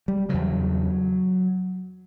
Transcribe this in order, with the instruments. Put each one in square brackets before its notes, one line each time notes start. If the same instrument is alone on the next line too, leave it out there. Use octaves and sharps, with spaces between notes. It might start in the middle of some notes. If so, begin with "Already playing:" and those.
[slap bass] G3
E2 C#3 F#3